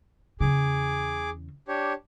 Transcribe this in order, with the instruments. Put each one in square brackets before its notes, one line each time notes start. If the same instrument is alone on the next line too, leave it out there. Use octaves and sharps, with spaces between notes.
[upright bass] E2 C#3 [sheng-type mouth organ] G#4 D6
[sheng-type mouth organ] D4 G4 C#5